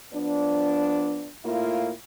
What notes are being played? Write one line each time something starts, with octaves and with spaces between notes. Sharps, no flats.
F3 B3 D4
A2 A#3 E4 F4